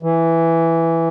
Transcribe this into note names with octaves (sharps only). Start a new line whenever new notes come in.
E3